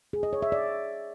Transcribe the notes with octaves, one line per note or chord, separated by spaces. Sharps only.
G#4
D#5
C#5
E5
D5